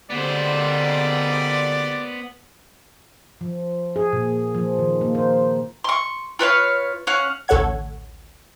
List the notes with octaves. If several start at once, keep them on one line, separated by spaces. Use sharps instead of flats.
G#1 A#2 D3 G3 B3 C5 D5
F3
G#4
A#2
F3
D#3
A#3
C5
C6 C#6
F4 B4 C#5 F5
C#4 F5 F#5
A1 D2 A4 C#5 F#5 G#6